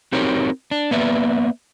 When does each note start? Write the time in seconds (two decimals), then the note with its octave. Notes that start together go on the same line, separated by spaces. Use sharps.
0.13 C4 D#4 F#4 G4 A#4 C#5
0.71 D4
0.91 A#3 B3 B4 D5 E5